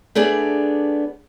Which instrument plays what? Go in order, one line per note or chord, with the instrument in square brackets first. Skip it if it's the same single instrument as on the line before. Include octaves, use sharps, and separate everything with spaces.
[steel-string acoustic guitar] A3 B3 D4 G#4 D5